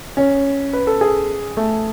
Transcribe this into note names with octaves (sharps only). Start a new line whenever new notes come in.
C#4
B4
A4
G#4
A3